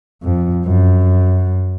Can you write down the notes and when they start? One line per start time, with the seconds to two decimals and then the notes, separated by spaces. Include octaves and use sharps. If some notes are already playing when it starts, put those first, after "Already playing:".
0.23 F2
0.65 F#2